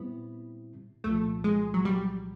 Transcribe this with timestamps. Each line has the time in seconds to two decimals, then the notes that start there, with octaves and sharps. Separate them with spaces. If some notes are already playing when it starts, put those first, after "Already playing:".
Already playing: A#2 G3 B3 C4 E4
1.04 C2 A#2 F3 A3
1.44 G#3
1.74 F#3
1.85 G3